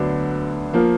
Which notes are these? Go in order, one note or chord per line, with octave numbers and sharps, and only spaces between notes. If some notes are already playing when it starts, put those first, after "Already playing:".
Already playing: D2 D3 F#3 B3 D4
F3 A#3